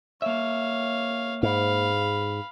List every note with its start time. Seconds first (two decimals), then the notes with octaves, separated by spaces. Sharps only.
0.22 A#3 C#5 E5 F5
1.43 G#2 F5 B5